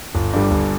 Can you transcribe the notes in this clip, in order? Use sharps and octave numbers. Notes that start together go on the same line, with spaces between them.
G1
G2 D3 G3
G1